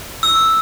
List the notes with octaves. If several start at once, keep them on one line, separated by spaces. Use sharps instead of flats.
E6